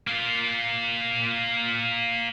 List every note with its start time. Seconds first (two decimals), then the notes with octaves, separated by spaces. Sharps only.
0.07 A#3 F4